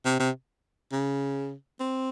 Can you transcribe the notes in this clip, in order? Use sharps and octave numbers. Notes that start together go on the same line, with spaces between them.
C3
C3
C#3
C4